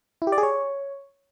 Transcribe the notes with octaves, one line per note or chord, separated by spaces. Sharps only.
E4
G4
D5
G#4
C#5